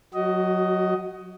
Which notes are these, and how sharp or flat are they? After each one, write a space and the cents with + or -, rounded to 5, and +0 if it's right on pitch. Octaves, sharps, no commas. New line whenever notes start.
F#3 -15 F#4 +30 D#5 +5